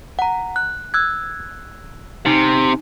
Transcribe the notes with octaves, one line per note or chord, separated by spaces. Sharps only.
F#5 A#5
F#6
E6 F#6 G#6
C3 D#4